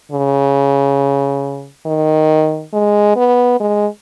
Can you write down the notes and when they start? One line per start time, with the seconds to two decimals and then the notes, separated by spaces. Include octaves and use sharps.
0.12 C#3
1.86 D#3
2.73 G#3
3.16 B3
3.60 G#3